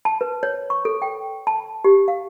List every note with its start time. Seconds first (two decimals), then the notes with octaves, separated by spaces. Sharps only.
0.05 A5
0.21 B4
0.43 C#5
0.70 C#6
0.85 A4
1.02 G5
1.47 A5
1.84 G4
2.08 F5